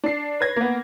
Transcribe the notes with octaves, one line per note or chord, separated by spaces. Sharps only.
D4 C7
B4 C#5 G#6 A#6
A#3 B3